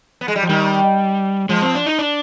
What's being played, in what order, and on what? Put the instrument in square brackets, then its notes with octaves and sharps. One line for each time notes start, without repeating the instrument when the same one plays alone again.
[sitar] B3
G#3
G3
F3
[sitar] D#3 [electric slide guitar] G3
[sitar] F3 [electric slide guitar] G#3
[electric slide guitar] C4
D4
D#4
D4